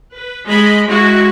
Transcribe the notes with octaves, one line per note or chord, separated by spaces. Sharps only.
B4
G#3 D#5 B5
G#3 E4 F#4